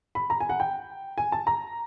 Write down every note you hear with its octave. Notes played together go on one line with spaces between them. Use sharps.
B5
A#5
G#5
F#5
G5
G#5
A5
A#5